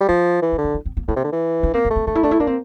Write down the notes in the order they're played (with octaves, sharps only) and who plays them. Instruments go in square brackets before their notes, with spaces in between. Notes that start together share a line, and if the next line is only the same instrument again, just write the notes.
[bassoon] G3
[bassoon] F3 [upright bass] A3
[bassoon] E3
[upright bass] C4
[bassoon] D3
[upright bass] D4
E4
C4
A#3
[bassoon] A2 [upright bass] A#3
[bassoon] C3
D3
E3
[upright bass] D4
[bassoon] A#3 [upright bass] C4
[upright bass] C4
[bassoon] A3
[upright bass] C4
[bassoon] A3 [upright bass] D4
[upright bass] E4
[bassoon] A3 [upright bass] D4
[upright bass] E4
[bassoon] A#3 [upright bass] D4
[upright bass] C4